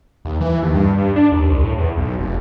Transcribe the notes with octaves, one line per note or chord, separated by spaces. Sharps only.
D#2
E3
D#2
G2
G2
D4
D#2
C2
A2
E2
B1
F1